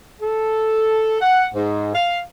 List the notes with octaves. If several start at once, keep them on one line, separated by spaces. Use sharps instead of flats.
A4
F#5
G#2
F5